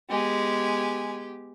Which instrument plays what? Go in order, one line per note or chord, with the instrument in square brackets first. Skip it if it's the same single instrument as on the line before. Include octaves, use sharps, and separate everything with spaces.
[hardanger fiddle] G#3 G#5 [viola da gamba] B3 G4